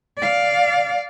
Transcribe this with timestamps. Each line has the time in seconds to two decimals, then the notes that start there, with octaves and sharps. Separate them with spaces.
0.18 D5 F5